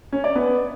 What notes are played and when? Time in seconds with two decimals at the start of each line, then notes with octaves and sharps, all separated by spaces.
0.12 C#4
0.24 D5
0.35 B3